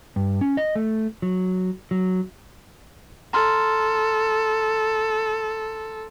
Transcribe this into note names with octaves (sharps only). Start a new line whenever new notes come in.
G2
C#4
D#5
A3
F#3
F#3
A4 A#5 C6 F6